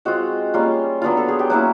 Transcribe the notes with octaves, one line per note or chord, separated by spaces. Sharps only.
G#3 C4 F4 F#4
G3 A#3 C#4 F4
F#3 B3 D4 F4
A4
G#4
G4
F#3 A#3 C#4 E4 F#4